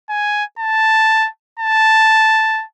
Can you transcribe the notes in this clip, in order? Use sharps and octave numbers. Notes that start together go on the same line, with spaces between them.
G#5
A5
A5